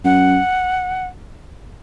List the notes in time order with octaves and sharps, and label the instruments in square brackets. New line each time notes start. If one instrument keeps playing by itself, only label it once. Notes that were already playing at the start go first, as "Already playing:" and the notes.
[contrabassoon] F#2 [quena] F#5